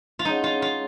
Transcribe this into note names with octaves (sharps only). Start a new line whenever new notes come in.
F4
G#3 C#4 D#4 G#4 C#5 F#5
F4
F4